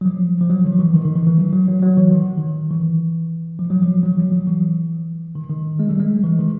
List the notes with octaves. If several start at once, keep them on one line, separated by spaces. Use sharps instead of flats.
F#3
F3
F3
F#3
D#3
F3
E3
D#3
D#3
E3
E3
F#3
F#3
F#3
F#3
E3
D#3
D#3
E3
F3
F#3
F3
F#3
E3
F3
F#3
E3
D#3
D#3
G#3
G3
G#3
E3
D#3